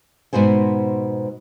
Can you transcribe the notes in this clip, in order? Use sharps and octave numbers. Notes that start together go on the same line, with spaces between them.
G#2 B2 F#4 C5 G#5